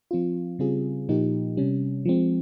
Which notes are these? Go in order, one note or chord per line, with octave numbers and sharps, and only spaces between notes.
F3 C4 F4
C#3 G3 C4 F4 G#4
A#2 F3 A#3 D#4 G4
C3 G3 C#4
F3 G#3 C4